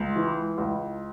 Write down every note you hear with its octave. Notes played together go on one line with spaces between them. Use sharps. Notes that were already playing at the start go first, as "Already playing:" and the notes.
Already playing: C#2
E3
C#2